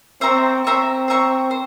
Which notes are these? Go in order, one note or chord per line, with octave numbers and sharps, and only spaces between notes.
C4 C5 E5 A#5 C#6
C4 C5 E5 A#5 C#6
C5 E5 A#5 C#6
C5